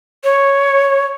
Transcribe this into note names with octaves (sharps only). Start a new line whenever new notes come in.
C#5